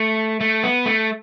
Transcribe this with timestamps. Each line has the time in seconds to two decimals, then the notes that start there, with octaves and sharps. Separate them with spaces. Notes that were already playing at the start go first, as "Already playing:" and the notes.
Already playing: A3
0.41 A3
0.63 B3
0.86 A3